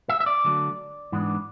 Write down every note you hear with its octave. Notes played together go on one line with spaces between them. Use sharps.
E5
E5
D5
D3 F#3 A3
G#2 E3 B3 D4